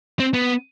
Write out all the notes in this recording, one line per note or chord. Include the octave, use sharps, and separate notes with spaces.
C4
B3